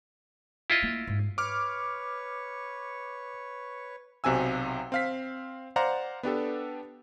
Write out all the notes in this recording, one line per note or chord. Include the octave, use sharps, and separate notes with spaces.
E4 F4 D#5
A#3
G#2
B4 C#5 C#6 D6 F6
B1 C3 F#4 G#5 E6
C4 F5 B6
C5 D5 F5 F#5 A#5
B3 D4 G4 A4